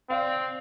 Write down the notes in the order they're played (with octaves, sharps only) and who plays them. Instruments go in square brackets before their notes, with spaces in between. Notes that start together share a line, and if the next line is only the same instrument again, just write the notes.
[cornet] C4 [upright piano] D5 F5